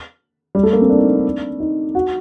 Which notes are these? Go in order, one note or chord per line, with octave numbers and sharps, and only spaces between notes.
G3
A3
A#3
C4
D4
D#4
D4
D#4
F#4